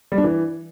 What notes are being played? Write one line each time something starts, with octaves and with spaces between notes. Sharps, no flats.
G3
D4
E3